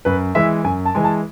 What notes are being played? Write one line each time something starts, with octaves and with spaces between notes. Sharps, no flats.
F#2 B4
E3 G#3 E5
F#2 G#5
A5
E3 G#3 G#5
A5